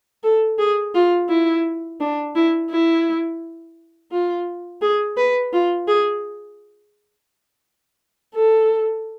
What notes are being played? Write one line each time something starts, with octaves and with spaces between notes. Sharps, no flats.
A4
G#4
F4
E4
D4
E4
E4
F4
G#4
B4
F4
G#4
A4